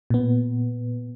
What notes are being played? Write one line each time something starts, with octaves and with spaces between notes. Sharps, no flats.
A#2 B3